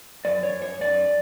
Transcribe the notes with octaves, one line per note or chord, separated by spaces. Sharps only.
F#2 D5
C#5
F#2
C#5
F#2 D5